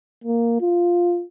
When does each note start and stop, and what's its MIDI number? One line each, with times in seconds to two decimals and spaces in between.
0.24 0.61 58
0.61 1.23 65